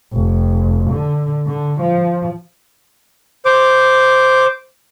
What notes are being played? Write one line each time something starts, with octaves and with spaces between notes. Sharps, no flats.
F1
D3
D3
F3
C5 D6